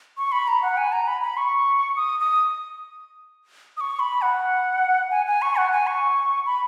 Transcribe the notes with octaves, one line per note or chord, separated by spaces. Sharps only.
C#6
B5
A#5
F#5
G#5
A#5
B5
B5
C#6
D#6
D#6
D#6
C#6
B5
F#5
G#5
G#5
C#6
F#5
G#5
C#6
B5